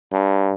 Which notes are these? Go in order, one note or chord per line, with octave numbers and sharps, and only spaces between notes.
G2